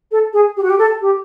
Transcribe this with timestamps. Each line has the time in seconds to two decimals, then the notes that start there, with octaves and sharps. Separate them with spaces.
0.12 A4
0.33 G#4
0.57 G4
0.63 F#4
0.70 G4
0.79 A4
1.01 G4